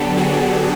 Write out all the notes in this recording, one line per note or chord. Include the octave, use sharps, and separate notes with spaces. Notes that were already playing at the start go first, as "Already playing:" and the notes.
Already playing: D3 F#3 B3 D4 G4 A4
F#4 G#4